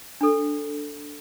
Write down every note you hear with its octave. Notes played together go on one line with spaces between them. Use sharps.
D4 A4